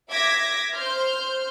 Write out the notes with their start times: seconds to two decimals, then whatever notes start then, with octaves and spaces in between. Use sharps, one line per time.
0.10 E5 D6 G#6 A#6 B6
0.75 C5 C6 F6 G6